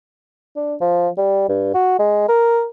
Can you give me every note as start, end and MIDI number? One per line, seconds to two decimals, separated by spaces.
0.56 0.75 62
0.81 1.09 53
1.18 1.47 55
1.49 1.70 43
1.74 1.98 66
1.99 2.27 56
2.28 2.66 70